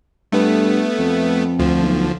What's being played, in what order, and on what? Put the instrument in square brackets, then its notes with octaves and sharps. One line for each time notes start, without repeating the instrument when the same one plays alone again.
[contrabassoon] G2 [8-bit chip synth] A3 B3
[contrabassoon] F2
[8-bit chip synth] D2 F3
[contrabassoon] B1